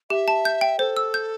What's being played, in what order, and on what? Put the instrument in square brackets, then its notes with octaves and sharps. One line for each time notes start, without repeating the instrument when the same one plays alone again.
[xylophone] G4 [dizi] E5
[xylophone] A5
G6
G5
[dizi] A4 [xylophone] C5
[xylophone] E6
G6